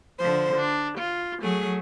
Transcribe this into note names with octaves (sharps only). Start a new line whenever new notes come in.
D3 F3 C5
D4
F4
F#3 A3 G#4